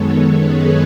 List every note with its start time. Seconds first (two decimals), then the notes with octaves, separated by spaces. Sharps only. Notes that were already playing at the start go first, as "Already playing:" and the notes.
Already playing: F#2 D#3 G#3 B3 A4 C#5
0.37 G#4 B4